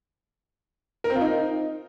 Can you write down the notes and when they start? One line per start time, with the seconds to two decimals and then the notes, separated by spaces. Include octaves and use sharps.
1.04 A#4
1.10 C4
1.15 F4
1.21 D#4